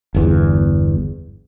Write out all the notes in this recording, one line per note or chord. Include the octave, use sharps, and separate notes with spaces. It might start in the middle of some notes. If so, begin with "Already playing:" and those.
G1 E2